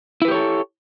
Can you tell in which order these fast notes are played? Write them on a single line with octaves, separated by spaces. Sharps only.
E4 B4 G4 C#5 A4